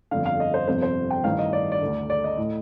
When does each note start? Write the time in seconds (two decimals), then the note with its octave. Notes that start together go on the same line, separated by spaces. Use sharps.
0.11 G1 F2 D3 F5
0.26 F5
0.40 D#5
0.54 C5
0.68 G1 F2 C3 C5
0.82 C5
1.11 G5
1.24 A1 G2 D#3 F5
1.39 D#5
1.53 D5
1.72 D5
1.81 D3
1.86 D2
2.10 D5
2.24 D#5
2.37 A2